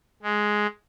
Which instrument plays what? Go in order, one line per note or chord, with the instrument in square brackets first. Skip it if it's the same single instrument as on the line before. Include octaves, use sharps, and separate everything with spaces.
[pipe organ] G#3